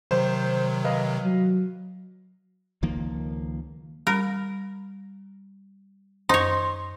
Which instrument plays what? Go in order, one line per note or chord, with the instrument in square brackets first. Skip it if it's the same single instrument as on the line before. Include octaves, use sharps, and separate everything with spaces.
[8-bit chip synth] C3 D#3 F#3 [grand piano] C5
[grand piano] B4 D#5 F5
[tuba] F#3
[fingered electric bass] C#2 D#3 F3 A#3
[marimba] G3 B5 [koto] A#4
[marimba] F#2 C5 [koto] D#4 C#5 [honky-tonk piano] C6